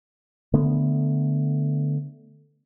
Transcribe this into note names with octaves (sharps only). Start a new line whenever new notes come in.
D3 A3 B3